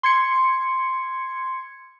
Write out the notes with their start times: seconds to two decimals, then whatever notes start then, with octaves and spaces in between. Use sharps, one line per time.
0.03 C6 G#6 C#7